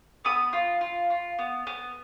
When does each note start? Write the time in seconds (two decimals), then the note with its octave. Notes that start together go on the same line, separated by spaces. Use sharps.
0.25 B3 B5 D#6
0.53 F4
0.81 F4
1.10 F4
1.39 B3
1.67 B3